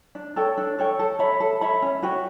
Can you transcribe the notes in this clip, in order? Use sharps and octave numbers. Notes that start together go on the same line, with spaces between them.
D4
A4 C#5 G5
D4
A4 C#5 G5
A4
C#5 E5 B5
A4
C#5 E5 B5
C#4
F#4 C#5 G5